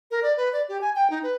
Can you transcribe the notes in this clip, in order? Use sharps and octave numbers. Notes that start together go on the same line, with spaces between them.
A#4
D5
B4
D5
G4
G#5
G5
D#4
B4